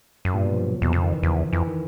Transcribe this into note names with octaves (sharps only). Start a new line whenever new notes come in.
F#2
G2 A#2
B2
F3
F#3
C3
E2 B2
F2 C#3
D#3
E3
E2 F3
F2 E3
D#3